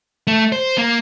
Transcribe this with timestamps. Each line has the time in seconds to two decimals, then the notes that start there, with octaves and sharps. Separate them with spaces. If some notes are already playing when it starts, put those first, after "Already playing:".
0.27 A3
0.52 C5
0.78 A#3